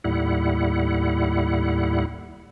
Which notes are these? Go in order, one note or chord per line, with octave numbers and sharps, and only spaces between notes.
D#2 A2 G3 E4 F#5